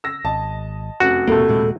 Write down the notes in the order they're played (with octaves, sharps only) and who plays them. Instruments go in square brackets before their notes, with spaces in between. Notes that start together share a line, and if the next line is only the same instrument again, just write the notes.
[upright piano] E6 A#6
[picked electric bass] G#1 [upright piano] D#5 A5
[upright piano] F1 F#2 [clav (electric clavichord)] F#4
[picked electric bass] E1 A#3 [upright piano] A2 C3 A3 [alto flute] A4
[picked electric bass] D#1 A#2 G#3